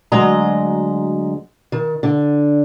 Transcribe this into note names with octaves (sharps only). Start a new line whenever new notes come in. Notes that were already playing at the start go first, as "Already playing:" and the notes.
D2 F#3 G#3 D#5 A#5
D#3
D3